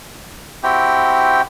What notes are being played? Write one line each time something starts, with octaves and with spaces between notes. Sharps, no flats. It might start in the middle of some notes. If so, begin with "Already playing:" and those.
C4 E4 F#4 G4 G5